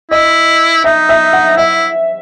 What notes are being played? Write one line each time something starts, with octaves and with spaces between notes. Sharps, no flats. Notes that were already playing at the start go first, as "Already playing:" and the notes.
E4 D#5
D#4 E5
E5
F#5
E4 E5